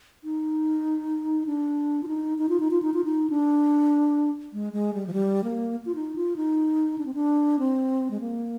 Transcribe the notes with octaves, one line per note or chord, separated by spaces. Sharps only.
D#4
D4
F4
D#4
D#4
F4
D#4
F4
D#4
F4
D#4
D4
G#3
G#3
G3
F3
G3
A#3
F4
D#4
F4
D#4
D4
C4
D4
C4
G#3
A#3